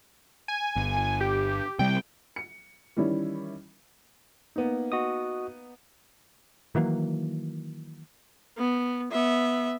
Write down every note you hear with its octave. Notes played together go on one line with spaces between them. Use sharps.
G#5
G1
G4
C3 G3 G5
C#7
D#3 E3 G3 C#4 E4
A#3 B3 D#4
F#4 D#5 D#6
D#3 E3 F#3 A#3
B3
B3 E5